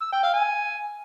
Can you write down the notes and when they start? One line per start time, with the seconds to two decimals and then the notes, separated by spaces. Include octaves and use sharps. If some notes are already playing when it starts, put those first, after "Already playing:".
0.02 E6
0.12 G5
0.23 F5
0.34 G#5